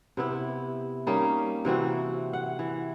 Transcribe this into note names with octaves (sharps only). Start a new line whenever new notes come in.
C3 B3 E4
G3 A#3 C#4 D#4
C3 E3 C4 F#4
F#5
E3